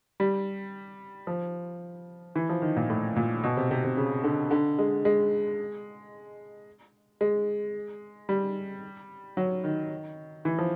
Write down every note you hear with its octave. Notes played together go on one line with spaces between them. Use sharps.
G3
F3
E3
F3
D#3
A#2
A2
A#2
B2
C3
C3
C3
C#3
D3
D3
G#3
G#3
G#3
G3
F#3
D#3
E3
F3